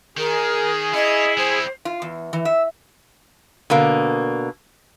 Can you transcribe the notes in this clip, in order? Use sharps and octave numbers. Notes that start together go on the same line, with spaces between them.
D#3 G#4 A#4
C#4 E4 D#5
G3 C4 C5
F4
E2
E3
E5
B2 D3 A#3